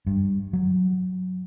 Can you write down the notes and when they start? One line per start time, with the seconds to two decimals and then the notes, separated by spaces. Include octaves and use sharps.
0.07 G2
0.53 F#3